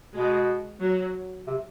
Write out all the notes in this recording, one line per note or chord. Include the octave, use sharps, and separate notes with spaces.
B2 G#3
F#3
C3